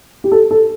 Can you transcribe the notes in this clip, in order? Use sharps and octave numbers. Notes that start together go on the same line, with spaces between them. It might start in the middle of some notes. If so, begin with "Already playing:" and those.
G4
A4
A4